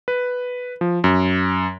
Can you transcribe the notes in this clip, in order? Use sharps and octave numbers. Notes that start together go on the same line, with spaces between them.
B4
F3
F#2